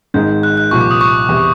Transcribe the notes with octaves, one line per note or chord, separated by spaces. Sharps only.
G#1 G#2 D#3 G#3 G6
F#6
F#6
C2 A#2 F3 C#6
D6
D#6
C#6
E2 C3